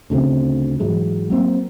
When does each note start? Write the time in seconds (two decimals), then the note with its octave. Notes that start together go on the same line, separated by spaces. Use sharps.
0.10 D2 C#3 G3 C4
0.80 G#2 E3 F#3 G#3
1.30 F#3 A#3 C4